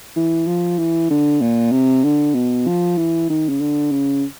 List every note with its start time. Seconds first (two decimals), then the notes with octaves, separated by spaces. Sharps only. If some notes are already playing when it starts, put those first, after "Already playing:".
0.16 E3
0.47 F3
0.78 E3
1.10 D3
1.41 A#2
1.72 C3
2.04 D3
2.34 B2
2.67 F3
2.97 E3
3.29 D#3
3.49 C#3
3.60 D3
3.91 C#3